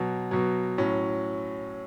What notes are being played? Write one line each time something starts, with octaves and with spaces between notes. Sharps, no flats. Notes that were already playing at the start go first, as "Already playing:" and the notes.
Already playing: B2 F#3
B2 F#3
A2 F#3 C#4